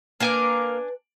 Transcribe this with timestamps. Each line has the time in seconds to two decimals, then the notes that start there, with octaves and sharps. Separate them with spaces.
0.20 A#3 D4 A#4 B4 G#5 D6